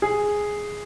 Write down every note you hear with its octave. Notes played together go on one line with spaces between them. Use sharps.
G#4